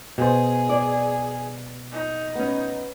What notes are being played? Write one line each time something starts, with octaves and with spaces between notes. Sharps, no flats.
B2 G#4 C5
D5
D#4
B3 C#4